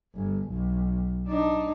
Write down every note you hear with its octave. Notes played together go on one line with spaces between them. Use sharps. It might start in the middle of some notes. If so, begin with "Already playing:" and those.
G1
B1
D4 D#4